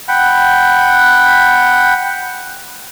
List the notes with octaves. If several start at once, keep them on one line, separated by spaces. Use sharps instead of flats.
F#5 G5 B5